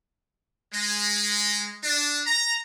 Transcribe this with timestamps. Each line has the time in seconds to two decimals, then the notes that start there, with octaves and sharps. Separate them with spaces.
0.73 G#3
1.83 D4
2.26 A#5